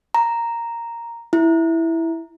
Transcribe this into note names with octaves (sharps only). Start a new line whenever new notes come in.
A#5
E4